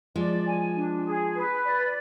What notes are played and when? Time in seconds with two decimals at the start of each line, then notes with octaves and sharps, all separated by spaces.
0.16 F3 G#3 D5
0.45 G#5
0.75 D4
1.05 G#4
1.35 B4
1.64 D5